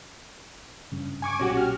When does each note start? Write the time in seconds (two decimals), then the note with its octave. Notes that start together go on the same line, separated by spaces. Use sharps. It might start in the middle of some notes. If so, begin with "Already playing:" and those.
0.92 F#1 G2 C#3
1.22 G#5 C#6 D6
1.40 B1 A#2 C#4 F#4 G4
1.57 F6